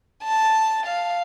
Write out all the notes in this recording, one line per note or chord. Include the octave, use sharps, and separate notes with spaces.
A5
F5